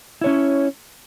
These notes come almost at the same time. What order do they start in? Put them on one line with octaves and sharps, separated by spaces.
E4 C#5 C#4